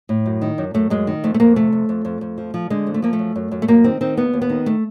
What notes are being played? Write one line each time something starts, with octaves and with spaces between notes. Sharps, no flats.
A2
F#2
D#3
F#2
F#2 A3
F#2 G#3
D#3
F2 A3
A3
F2 A#3
C3 A3
F2
F2
F2
F2
F3
F3
D3 G#3
F2
A3
F3 A#3
A3
F#2
F#2
F#2
A3
F#2 A#3
D#3 C4
D#3 C4
D#2 B3
D#2
B3
D#3
A3